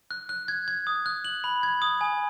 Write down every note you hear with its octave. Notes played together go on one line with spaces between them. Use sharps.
F#6
F#6
G#6
G#6
D#6
F#6
F#7
B5
G#6
D#6
G#5